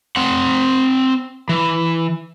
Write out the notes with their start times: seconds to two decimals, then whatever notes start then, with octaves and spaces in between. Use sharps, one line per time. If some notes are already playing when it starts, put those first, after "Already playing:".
0.16 C4 F#5
1.49 E3